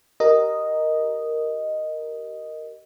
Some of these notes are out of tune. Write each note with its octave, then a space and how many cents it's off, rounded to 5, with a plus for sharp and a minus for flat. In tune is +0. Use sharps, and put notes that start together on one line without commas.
G4 -25 A#4 +0 D#5 +0